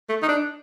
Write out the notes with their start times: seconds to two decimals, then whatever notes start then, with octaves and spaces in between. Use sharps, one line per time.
0.09 A3
0.22 D#4
0.29 D4